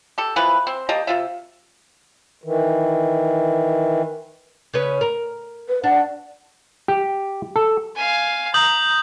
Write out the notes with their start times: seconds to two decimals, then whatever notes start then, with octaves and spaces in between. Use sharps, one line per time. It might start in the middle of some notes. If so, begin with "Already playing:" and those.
0.18 G4 A4
0.36 E3 F3 G#3 B4
0.67 C4
0.89 A#3 G4 D#5 A5
1.07 C3 F4 E5
2.44 D#3 E3
4.74 C#3 C#4 B4
5.01 A#4
5.69 B4
5.84 D4 F#5
6.88 G4
7.56 A4
7.96 F5 G#5
8.54 A#5 D#6 G6 F#7